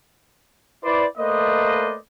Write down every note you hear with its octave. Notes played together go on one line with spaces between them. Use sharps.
E4 B4 C5 D5
A3 A#3 B4 C5 D5 D#5